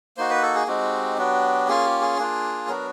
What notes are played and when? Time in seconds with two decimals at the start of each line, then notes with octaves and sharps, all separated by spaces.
0.17 A#3 D#4 F#4 C5
0.30 B4
0.42 A4
0.55 G#4
0.67 G#3 C4 D#4 F#4 G4
1.18 F#3 B3 D4 F#4
1.68 A#3 C#4 F4 G#4
1.85 G4
2.01 G#4
2.18 A#3 D4 F4
2.68 F#3 B3 D4 F#4 A#4